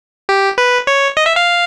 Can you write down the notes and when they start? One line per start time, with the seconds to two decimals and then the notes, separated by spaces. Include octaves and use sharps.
0.29 G4
0.58 B4
0.87 C#5
1.17 D#5
1.26 E5
1.36 F5